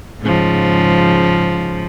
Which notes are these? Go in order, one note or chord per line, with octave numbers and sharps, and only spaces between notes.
G#2 C#3 F3